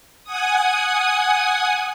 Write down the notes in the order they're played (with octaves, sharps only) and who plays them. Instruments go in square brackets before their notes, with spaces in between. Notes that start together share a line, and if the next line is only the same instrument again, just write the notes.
[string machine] F#5 G#5 D#6